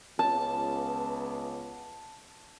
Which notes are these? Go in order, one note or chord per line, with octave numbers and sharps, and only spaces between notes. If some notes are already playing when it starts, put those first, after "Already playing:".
C#2 B3 A5